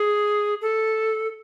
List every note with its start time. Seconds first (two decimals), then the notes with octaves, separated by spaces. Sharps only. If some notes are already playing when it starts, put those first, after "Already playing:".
Already playing: G#4
0.62 A4